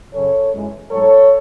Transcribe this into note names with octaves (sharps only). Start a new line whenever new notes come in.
F#2 C#3 F#3 C#4 A4 C#5
F#2 E3 G#3
G#2 F#3 A3 A4 C#5